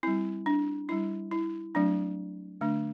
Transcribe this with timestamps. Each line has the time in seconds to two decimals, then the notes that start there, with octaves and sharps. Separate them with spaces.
0.03 G3 C4 E4
0.46 D4
0.89 G3 D4 E4
1.31 E4
1.75 F#3 A3 C4 D4
2.61 D3 A3 D4